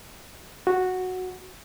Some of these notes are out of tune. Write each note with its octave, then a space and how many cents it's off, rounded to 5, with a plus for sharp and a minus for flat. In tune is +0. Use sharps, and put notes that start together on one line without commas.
F#4 -5